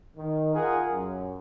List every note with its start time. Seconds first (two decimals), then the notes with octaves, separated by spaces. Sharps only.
0.17 D#3
0.55 F4 G#4 A#4 F#5
0.91 F#2